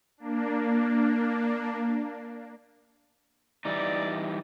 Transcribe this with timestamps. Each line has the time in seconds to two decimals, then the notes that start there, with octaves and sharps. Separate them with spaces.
0.18 A#3 D4
3.65 E3 G3 D#4 D5